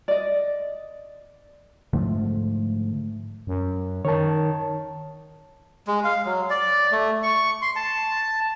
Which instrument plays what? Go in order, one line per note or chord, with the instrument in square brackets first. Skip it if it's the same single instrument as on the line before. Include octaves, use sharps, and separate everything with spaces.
[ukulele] D5 D#5
[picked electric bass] G#2 D3 F3 A3
[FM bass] F#2
[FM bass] D#3 [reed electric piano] C#5 A5
[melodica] G#3
F5
F#3
D5
A3
C#6
C6
A5